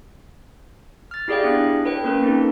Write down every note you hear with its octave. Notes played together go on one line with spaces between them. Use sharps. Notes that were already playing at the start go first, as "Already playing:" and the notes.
F6 A6
E4 G4 G#4 D5 F5 G5
B3 D4 E4 G4 F#6
A4 B4 C#5 G5
A#3 C#4 A#4 B4
C4 D#4 A4